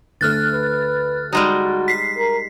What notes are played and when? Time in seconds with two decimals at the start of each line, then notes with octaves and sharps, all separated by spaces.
0.21 D2 A3 F6 F#6 A6
0.54 B4
1.33 G3 G#3 D#4 F#4
1.88 B6 C7
2.18 A#4